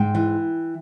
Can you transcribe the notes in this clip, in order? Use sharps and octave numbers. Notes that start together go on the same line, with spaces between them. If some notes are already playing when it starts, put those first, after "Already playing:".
Already playing: G#2 G5
E3